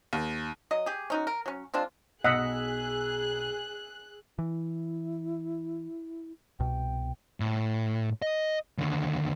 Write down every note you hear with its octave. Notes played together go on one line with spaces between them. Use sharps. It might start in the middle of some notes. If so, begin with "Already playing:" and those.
D#2
F#3 D#5
G4 G#4
C#4 D#4 F#4
A#4
F#3 C#4
G#3 C4 D4 F4
B1 G#4 D#5 F#5 E6 F#6 B6
E3 E4
C2 B2 G5
A2
D#5
D#2 D3